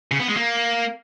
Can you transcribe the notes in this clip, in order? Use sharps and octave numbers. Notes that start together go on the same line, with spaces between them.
C#3
B3
G#3
A#3